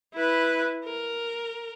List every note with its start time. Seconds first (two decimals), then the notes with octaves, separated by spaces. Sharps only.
0.14 E4 B4
0.85 A#4